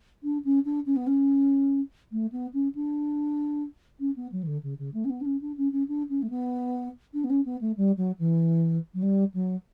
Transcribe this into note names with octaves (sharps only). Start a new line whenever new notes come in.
D4
C#4
D4
C#4
B3
C#4
A3
B3
C#4
D4
C#4
B3
F#3
E3
D3
C#3
C#3
A3
C#4
B3
D4
C#4
D4
C#4
C#4
D4
C#4
A3
B3
D4
B3
C#4
B3
A3
G3
F#3
E3
F#3
G3
F#3